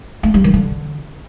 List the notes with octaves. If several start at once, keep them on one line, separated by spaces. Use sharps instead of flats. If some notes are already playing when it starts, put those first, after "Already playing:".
A3
G3
D#3
D3